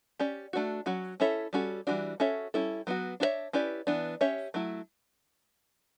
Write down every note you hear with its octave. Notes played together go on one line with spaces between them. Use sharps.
C#4 G4 D5
A3 D4 F#4
F#3 C#4 F#4
C#4 E4 A4 C#5 E5
G3 C#4 F#4 A4
E3 G3 D4 F#4
C#4 F#4 A4 C#5 E5
G3 C#4 E4 A4
F#3 B3 F#4
D4 F#4 A4 C#5 E5
C#4 E4 G4 B4 D5
E3 B3 D4
C#4 G4 C#5 E5
F#3 A3 E4